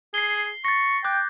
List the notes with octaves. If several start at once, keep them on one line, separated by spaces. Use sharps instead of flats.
G#4 C7 G7
C#6 A6 A#6
G5 D6 F#6 G6